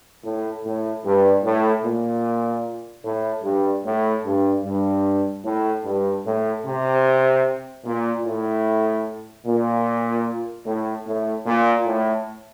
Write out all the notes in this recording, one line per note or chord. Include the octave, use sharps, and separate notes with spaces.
A2
A2
G2
A2
A#2
A2
G2
A2
G2
G2
A2
G2
A2
C3
A#2
A2
A#2
A2
A2
A#2
A2